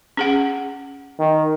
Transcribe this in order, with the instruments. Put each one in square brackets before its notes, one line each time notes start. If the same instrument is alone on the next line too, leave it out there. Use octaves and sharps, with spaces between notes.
[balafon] C#4 G#4 F#5
[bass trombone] D#3